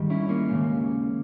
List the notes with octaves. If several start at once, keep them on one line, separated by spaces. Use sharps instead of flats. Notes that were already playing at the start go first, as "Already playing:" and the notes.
Already playing: G#2 D#3 G3
C#4 E4
A#3 C#4
D#2 C#3 G#3